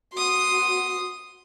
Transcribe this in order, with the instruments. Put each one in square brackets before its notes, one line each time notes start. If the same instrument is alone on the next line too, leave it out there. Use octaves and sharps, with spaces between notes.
[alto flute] F#4 [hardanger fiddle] C6 D#6